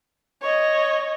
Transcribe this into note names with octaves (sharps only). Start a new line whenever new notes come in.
C#5 D#5